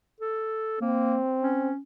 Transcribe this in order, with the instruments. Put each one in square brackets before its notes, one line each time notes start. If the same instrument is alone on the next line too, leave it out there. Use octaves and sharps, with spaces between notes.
[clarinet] A4
[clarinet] A#3 [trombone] C4
[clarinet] C#4